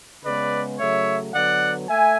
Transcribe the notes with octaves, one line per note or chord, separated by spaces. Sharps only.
C#3 G#3 B3 B4 D5
C#3 F#3 A3 C#5 E5
D3 F#3 B3 D5 F#5
A3 E5 G#5